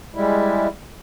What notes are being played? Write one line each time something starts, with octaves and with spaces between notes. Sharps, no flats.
G3 G#3 E4